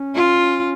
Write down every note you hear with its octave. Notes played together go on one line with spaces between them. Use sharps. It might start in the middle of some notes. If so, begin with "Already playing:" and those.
Already playing: C#4
F4